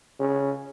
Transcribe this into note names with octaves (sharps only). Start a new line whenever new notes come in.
C#3